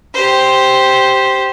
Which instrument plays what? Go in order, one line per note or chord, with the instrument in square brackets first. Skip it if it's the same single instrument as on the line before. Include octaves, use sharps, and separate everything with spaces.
[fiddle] G4 C5